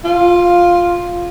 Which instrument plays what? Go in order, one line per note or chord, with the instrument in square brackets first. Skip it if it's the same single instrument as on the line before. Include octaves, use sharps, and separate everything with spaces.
[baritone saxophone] F4